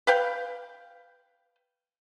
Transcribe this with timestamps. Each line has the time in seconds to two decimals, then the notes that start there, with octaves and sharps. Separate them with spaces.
0.07 B4 F5 G5